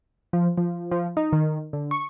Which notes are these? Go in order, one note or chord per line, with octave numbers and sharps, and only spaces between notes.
F3
F3
F3
D#4
D#3
D3
C#6